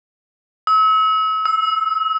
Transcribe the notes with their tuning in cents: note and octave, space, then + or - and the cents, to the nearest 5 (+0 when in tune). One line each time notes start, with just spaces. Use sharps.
E6 -40
E6 -10